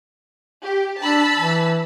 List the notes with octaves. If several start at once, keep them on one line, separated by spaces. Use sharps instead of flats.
G4
D4 A5 B5 E6
E3